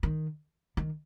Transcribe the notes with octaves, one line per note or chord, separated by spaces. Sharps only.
D#3
D#3